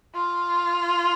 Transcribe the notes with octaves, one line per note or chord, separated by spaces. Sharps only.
F4